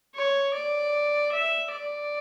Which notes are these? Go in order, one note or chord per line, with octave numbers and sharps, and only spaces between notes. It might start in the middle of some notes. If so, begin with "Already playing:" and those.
C#5
D5
E5
D5